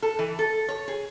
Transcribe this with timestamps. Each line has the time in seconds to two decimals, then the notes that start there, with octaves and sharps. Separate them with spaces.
0.02 A4
0.19 E3
0.39 A4
0.69 C#5
0.88 G#4